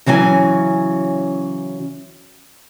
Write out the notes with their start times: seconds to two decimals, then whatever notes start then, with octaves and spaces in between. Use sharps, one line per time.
0.06 C#3 E3 F#3 C#4 G#5